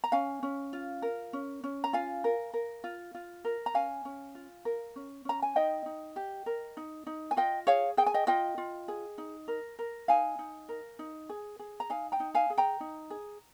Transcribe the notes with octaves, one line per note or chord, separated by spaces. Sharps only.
A#5
C#4 F5 G#5
C#4
F4
A#4
C#4
C#4
A#5
F4 F5 G#5
A#4
A#4
F4
F4
A#4
A#5
C#4 F5 G#5
C#4
F4
A#4
C#4
C#4 A#5
G#5
D#4 D#5 G5
D#4
G4
A#4
D#4
D#4
G#5
F4 D#5 G5
G#4 C#5 F5
G#4 G5
G#5
D#5 G5
F4 D#5 G5
F4
G#4
D#4
A#4
A#4
D#4 F5 G#5
D#4
A#4
D#4
G#4
G#4
A#5
D#4 F5 G#5
G5 A#5
D#4
F5 G#5
G#4
G5 A#5
D#4
G#4